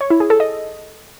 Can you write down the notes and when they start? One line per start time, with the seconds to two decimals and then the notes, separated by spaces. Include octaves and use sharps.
0.01 C#5
0.10 E4
0.20 G#4
0.30 A4
0.40 D#5